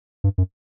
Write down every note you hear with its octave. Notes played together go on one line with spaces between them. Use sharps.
G2
F#2